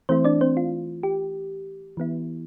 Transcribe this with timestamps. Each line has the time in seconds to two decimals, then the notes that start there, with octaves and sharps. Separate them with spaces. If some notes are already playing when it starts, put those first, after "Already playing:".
0.09 E3 A3 C4 E4 C5
0.24 D4 D5
0.41 C4 C5
0.57 F4
1.03 G4
1.97 E3 B3 E4